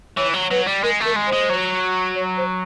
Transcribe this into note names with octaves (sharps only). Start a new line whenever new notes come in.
E3 C#5
F#3
F#3 B4
G3
G#3 A#4
A3 A#4
G#3
C5
G#3
F#3
C#5
C5